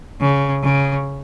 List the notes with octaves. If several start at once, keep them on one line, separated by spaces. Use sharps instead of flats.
C#3
C#3